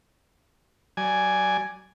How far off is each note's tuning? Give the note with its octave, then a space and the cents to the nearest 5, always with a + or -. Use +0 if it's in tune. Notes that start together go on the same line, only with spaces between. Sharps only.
F#3 +30 D5 +0 G#5 +0